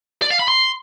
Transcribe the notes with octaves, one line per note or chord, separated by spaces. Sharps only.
D5
F5
B5
C6